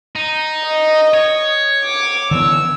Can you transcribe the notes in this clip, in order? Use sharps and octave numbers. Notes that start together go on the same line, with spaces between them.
D#4
D#5
C#5
D6
D3 E3 B3 E6